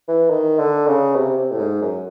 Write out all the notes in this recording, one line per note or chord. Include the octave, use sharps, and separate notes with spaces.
E3
D#3
D3
C#3
C3
C3
A2
G#2
F#2